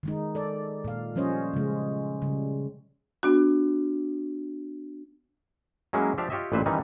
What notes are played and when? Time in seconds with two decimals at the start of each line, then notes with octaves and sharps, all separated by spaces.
0.03 D#3 G#3 D#4
0.35 A4 D5
0.84 A#2 F5
1.16 F3 G3 C#4 C5 C#5 D#5
1.54 C#3 G#3
2.22 C#3 G3
3.23 B3 D4 F#4
5.93 F#3 G#3 A#3 C#4 E4
6.18 F3 D4 G4 E5 F5
6.30 F4 G4 C#5 D#5 E5
6.52 A1 A#2 B4 C5 E5
6.66 D#3 E3 G3 C#4 D#4